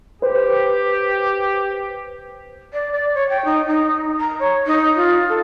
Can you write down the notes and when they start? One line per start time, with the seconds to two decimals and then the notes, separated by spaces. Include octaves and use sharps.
0.22 G4 B4 C5
2.73 D5
2.92 D5
3.15 C#5
3.29 G5
3.45 D#4
3.68 D#4
4.20 A#5
4.40 C#5
4.66 D#4
4.96 F4
5.29 A4